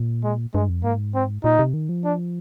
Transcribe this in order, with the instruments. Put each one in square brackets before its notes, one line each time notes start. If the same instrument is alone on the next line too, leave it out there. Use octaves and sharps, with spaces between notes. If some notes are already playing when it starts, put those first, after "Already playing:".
Already playing: [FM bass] A#2
[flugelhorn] G#3
[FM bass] G2 [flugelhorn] G#3
[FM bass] F2
[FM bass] G#2 [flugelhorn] A#3
[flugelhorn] C4
[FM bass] A#2 [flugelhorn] D#4
[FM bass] C3
D#3
F3
[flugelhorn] D4